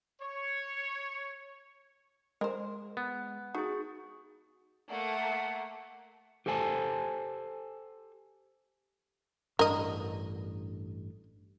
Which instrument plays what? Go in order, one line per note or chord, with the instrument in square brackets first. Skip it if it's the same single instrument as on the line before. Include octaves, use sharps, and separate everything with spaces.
[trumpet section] C#5
[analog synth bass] G#3 [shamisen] A#4 C5
[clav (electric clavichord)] B3
[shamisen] D#4 [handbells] F#4 G#4
[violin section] A3 A#3 [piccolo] F#5
[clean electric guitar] G4 A4 C5 F#5 G#5 A5
[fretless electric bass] A1 G2 D4 [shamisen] A#4 D#5